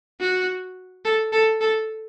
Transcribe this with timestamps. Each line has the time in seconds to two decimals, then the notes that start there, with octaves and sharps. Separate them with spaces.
0.20 F#4
1.05 A4
1.32 A4
1.61 A4